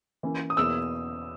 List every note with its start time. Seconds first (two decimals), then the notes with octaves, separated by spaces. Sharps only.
0.23 E3 A#3 C#4
0.50 D#6
0.57 E2 B2 A#3 E4 E6